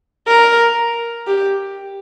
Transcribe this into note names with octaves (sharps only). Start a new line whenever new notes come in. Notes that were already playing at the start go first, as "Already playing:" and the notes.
A#4
G4